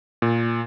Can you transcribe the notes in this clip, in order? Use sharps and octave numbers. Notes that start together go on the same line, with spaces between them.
A#2